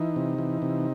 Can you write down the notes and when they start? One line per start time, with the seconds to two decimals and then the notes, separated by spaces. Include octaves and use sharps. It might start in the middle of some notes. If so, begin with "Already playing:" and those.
Already playing: E3 D#4
0.16 C3
0.38 E3
0.62 C3